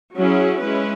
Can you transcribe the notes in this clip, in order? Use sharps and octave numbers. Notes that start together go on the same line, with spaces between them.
F#3 C#4 E4 G#4
G#3 C#4 E4 B4